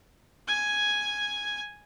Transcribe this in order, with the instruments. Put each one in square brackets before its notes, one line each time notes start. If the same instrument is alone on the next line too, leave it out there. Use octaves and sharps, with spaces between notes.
[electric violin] G#5 G#6